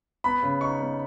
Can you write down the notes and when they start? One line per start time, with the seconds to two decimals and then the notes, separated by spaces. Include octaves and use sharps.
0.24 B3 B5
0.43 C#3
0.61 D#4 C#6
0.80 B3